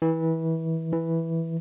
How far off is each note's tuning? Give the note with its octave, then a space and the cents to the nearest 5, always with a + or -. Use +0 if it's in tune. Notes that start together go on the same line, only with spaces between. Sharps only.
E3 -25
E3 -5